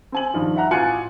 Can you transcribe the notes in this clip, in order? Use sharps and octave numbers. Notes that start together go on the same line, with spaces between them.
C4 G#5 F#7
G2 D#3 F3
E5 F#5 A#5 F#6
A1 F4 G#5 F#6 C#7